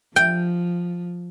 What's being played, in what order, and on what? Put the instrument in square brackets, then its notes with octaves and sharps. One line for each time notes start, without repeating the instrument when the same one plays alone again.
[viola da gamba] F3 [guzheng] G5